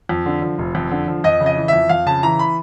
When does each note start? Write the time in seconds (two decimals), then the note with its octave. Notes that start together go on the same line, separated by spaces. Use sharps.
0.09 F2
0.26 D3
0.42 F3
0.59 F1
0.75 F2
0.91 D3
1.08 F3
1.24 F2 D#5
1.40 C#3
1.46 D#5
1.57 E3
1.68 F2 E5
1.89 F2 F5
2.06 C#3 A5
2.23 E3 A#5
2.39 B5